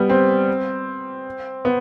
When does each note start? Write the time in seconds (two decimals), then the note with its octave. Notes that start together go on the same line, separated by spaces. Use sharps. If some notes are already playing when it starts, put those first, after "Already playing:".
Already playing: G3 B3
0.09 C4
1.65 B3